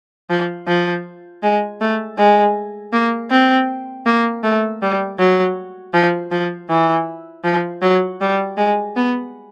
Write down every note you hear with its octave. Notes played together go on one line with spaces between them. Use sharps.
F3
F3
G#3
A3
G#3
A#3
C4
A#3
A3
G3
F#3
F3
F3
E3
F3
F#3
G3
G#3
B3